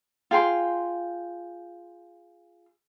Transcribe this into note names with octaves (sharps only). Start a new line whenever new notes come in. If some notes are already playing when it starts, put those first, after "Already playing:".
F4 G#4 G5 C6